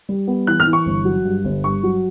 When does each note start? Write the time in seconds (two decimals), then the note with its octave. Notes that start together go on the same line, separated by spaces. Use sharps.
0.09 G3
0.28 B3
0.47 E3 F#6
0.60 F6
0.66 E3
0.73 C#6
0.86 G1
1.05 F#3
1.25 G2
1.44 G1
1.64 G2 C#6
1.83 F#3